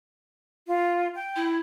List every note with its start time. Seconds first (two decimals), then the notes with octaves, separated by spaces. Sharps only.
0.68 F4
1.15 G5
1.35 E4